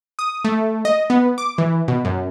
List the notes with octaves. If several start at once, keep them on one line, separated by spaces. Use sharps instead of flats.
D#6
A3
D#5
B3
D6
E3
B2
F#2